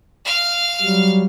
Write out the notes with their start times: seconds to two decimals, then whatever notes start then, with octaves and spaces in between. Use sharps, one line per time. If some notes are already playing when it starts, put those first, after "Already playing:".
0.25 F5 F6
0.81 F#3 G3